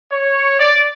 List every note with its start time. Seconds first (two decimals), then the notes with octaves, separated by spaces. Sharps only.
0.11 C#5
0.59 D5